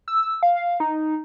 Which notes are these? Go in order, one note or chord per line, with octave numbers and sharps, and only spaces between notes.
E6
F5
D#4